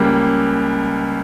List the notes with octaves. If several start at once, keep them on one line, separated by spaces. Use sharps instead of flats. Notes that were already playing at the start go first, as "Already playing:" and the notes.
Already playing: C#2 C#3 G3 A#3